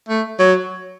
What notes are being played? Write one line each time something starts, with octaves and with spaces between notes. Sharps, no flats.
A3
F#3